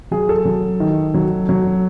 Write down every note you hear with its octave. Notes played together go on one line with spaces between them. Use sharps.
F#3 G#4
A4
F#3
D#3
F#3
F#3